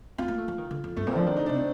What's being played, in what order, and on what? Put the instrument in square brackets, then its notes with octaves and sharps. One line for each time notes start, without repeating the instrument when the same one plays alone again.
[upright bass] C4 [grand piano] F4
[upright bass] A#3
A3
F3
D#3
D3
F2
[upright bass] G2 [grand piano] A3
[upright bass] A#2 [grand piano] C4
[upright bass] F3 [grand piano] D4
[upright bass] D#3 [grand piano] D4
[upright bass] D3 [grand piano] D#4
[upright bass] C3 [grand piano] D4
[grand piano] C4